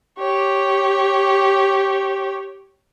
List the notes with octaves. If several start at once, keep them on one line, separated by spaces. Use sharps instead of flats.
G4 C#5